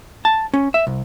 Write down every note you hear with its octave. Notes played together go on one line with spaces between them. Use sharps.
A5
C#4
E5
C2